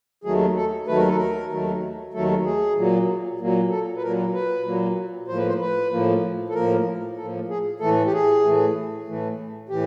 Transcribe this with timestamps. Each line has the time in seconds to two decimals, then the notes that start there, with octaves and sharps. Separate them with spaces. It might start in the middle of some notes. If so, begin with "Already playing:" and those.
0.24 D#2 D#3 F#3 A3 G#4
0.56 A4
0.87 D#2 D#3 F#3 A3 B4
0.97 A#4
1.07 A4
1.17 A#4
1.51 D#2 D#3 F#3 A3
2.13 D#2 D#3 F#3 A3 A4
2.45 G#4
2.76 A#2 F#3 A#3
3.39 A#2 F#3 A#3
3.70 A4
3.97 B4
4.02 A#2 F#3 A#3 A#4
4.33 B4
4.65 A#2 F#3 A#3
5.28 A2 F3 A#3 C5
5.38 B4
5.48 C5
5.60 B4
5.91 A2 F3 A#3
6.49 A4
6.54 A2 F3 A#3 A#4
7.17 A2 F3 A#3 A4
7.49 G#4
7.80 A2 E3 A3 A4
8.06 G4
8.13 G#4
8.44 A2 E3 A3
9.07 A2 E3 A3
9.69 A2 E3 G4